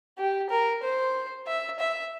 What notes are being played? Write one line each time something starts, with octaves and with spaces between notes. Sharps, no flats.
G4
A#4
C5
E5
E5